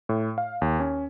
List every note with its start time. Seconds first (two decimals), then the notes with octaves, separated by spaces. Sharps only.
0.09 A2
0.38 F5
0.62 D#2
0.80 C#4